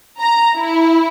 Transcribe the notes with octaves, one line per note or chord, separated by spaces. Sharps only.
A#5
E4